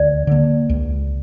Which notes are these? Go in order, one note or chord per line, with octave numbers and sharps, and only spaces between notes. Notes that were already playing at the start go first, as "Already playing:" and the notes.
Already playing: D2 D5
D3 A#3
C#2